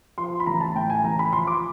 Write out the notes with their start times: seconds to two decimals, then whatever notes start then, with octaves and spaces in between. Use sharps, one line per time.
0.18 F3 C6
0.40 B5
0.46 A1 A#5
0.61 A5
0.75 A2 G5
0.90 G#5
1.04 A1 A#5
1.19 B5
1.33 F3 C6
1.47 D6